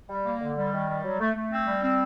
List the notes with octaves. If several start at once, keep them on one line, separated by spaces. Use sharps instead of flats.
G3
A#3
D3
G3
D#3
G3
F#3
A3
A3
C4
G3
C4